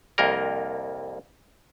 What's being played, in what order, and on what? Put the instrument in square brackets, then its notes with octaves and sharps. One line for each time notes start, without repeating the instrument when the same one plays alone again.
[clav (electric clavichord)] C2 F2 A#3 A#4